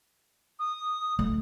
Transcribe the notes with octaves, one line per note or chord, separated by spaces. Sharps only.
D#6
A3